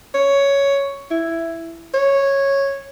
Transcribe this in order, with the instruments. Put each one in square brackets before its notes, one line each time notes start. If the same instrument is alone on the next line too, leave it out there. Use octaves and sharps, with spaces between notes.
[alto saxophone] C#5
E4
C#5